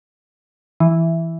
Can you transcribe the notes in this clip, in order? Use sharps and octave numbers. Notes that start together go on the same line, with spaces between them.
E3